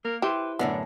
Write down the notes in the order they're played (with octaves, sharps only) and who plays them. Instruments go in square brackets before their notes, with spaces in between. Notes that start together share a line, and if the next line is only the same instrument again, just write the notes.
[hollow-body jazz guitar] A#3 [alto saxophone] A#4
[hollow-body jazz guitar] E4 C5 [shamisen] G4 [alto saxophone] B4
[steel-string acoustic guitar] F#2 A2 D3 [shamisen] B3 [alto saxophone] D4